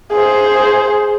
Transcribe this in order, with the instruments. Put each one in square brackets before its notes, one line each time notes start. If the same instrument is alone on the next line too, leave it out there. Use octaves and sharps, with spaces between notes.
[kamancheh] G#4 C5